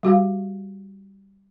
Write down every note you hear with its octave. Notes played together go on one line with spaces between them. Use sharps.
G3 F#4 G4 F5